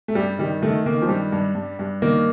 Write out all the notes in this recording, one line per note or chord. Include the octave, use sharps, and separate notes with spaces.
A3
G2 G3
D#3 G3
D#3 A3
D#3 A#3
F3
G2 G3
G2
G2
G2
D#3 A#3